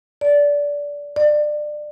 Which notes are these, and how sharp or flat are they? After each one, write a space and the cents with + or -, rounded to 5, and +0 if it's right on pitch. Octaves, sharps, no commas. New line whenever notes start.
D5 -20
D5 +25